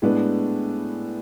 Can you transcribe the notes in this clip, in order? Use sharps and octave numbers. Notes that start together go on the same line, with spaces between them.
A2 G#3 B3 D4